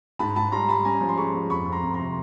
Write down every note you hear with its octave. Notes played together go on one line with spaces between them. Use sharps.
G#2 A5 B5
G#2 A5 B5
G3 A#5 C6
G3 A5 B5
C#4 G#5 A#5
F3
C6
G#3 B5 C#6
F3
F2 B5 C#6
F2
A#5 C6
F2
A#5 C6
C3